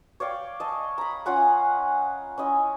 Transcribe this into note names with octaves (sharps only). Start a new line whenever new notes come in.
C#5 D5 F5 G5
D#5 A5
A#5 B5
C#4 F4 F#5 G#5
C#4 E4 D#5